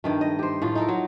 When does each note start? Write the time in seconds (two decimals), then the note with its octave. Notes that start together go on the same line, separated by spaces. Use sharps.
0.04 G2 D#3 A3
0.21 D#5
0.39 G4 C5
0.62 A2 A3 F4
0.75 D#4 A4 A#4
0.88 F#3